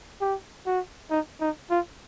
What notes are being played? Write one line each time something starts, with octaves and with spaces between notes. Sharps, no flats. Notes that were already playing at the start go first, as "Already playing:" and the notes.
G4
F#4
D#4
D#4
F4